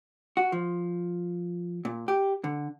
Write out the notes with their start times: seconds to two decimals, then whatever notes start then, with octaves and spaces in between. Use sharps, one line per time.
0.37 F#4
0.52 F3
1.85 A#2
2.08 G4
2.44 D3